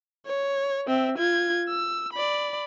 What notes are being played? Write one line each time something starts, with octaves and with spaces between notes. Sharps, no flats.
C#5
C4 E5
F4 G#6
E6
D5 B5